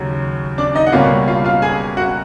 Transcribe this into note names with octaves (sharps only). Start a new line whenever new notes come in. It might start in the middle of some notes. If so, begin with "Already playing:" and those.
Already playing: D#2 C#3 F#3
D4 D5
D#4 D#5
F#5
C#2 B2 G3 A#3 C#4 F4 F5
F4 F5
F4 F5
G#4 G#5
F#4 F#5